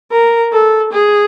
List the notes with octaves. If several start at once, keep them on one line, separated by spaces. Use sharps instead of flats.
A#4
A4
G#4